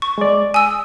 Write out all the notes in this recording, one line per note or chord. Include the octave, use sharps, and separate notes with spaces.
C#6
G#3 D5
G#5 D#6 E6